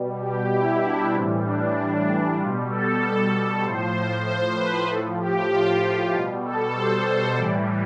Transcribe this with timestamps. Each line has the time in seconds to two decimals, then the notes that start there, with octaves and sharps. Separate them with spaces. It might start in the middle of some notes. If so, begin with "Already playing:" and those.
Already playing: B2 G3
0.21 G4
0.52 E4
0.84 D4
1.14 A2 E3 G3 C4
1.45 D4
1.77 D4
2.39 B2 G3 F4
2.70 A4
3.64 A2 F3 C5
4.25 C5
4.57 B4
4.89 A2 F3 A4
5.20 G4
5.50 F4
6.13 B2 G3 F4
6.45 A4
6.76 C5
7.37 A2 E3 G3 D5